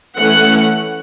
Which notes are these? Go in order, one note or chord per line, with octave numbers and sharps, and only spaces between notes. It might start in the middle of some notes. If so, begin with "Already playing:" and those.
E3 A3 C#4 F#5